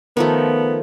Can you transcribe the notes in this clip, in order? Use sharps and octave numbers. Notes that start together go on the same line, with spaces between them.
D#3 F3 A3 B3